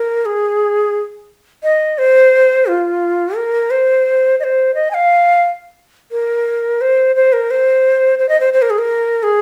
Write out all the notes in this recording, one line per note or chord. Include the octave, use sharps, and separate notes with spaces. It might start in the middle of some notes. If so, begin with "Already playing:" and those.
Already playing: A#4
G#4
D#5
C5
F4
A#4
C5
D#5
C5
D#5
G#5
F5
A#4
C5
C5
A#4
C5
C5
D#5
C5
C5
A#4
G#4
A#4
G#4